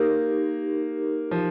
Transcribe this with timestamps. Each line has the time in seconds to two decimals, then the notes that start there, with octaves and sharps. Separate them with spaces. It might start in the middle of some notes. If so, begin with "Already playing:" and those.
Already playing: A#3 D#4 G4 A#4
1.31 F3